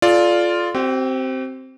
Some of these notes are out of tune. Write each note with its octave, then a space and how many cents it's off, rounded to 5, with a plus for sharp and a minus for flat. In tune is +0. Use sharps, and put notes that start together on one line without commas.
F4 +0 A4 -30 D5 +0
C4 +0 G4 -45